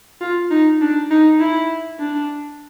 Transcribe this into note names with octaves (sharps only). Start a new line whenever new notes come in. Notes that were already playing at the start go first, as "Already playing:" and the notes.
F4
D#4
D4
D#4
E4
D4